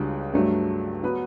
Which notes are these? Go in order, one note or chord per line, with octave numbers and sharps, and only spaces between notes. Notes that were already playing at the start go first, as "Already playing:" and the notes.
Already playing: C#2 C#3 G3 D4 F#4
G2 F#3 A3 D4
F#3 B3 F#4 B4